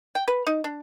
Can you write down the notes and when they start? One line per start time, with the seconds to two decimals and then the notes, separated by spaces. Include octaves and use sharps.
0.15 G5
0.28 B4
0.47 D#4
0.64 D4